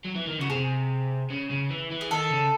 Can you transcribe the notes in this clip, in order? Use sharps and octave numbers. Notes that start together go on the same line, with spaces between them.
F#3
E3
D#3
C#3 F#4
C3 G#4
C#3
C#3
E3
E3
G#4
D#3 A4
C#3